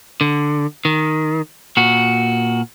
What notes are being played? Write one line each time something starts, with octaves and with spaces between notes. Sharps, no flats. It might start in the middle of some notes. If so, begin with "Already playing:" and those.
D3
D#3
A#2 F#4